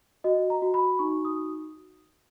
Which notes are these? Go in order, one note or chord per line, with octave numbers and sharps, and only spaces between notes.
F#4 D#5
A#5
F#4
B5
D#4 C#6
D#6